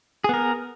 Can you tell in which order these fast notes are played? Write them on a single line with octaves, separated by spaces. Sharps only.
G#4 B3 A#4